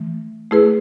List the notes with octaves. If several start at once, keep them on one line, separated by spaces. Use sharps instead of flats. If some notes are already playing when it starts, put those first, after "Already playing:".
Already playing: E3 A3
A3 E4 G#4 B4